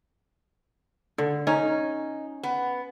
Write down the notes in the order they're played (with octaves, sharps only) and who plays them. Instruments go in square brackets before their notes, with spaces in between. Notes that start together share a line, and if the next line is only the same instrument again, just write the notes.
[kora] D3
[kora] C#4 [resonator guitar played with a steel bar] D#4
[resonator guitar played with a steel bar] B3